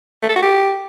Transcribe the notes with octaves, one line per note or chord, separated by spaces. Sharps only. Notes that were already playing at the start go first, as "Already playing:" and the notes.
A3
A4
F#4
G4